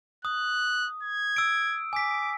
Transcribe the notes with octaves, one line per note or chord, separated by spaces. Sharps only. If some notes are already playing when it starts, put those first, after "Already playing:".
D#6 F#6
G#6
E6 D7
G#5 D6 B6